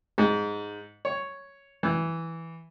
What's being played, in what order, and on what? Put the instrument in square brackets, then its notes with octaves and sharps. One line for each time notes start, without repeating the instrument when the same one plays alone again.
[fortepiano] G#2
C#5
E3